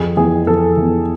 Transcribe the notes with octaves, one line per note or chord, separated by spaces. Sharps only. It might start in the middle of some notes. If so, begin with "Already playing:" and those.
Already playing: F2 G#4
E3 B3 G#4
F2 A4
E3 B3